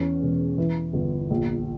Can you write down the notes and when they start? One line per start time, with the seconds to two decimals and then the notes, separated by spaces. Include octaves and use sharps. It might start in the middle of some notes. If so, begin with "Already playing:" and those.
Already playing: E2 C#4
0.22 E1
0.58 E3
0.93 G1
1.30 A#1